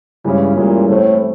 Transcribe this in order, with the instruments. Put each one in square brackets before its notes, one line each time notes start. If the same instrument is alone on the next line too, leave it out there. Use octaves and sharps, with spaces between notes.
[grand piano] G2 E3 G#3 C#4 E4 [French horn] C#3
[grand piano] G2 E3 G#3 C#4 E4 [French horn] A#2
[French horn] A2 [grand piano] E3 A3 C4